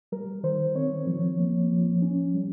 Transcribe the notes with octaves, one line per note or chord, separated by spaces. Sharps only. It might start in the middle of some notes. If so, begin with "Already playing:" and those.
G3 A#4
D#3 C5
C4 C#5
F3
A#3
F3
C#4
G3